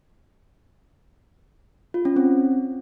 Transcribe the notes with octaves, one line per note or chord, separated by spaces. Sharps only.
F4
C#4
C4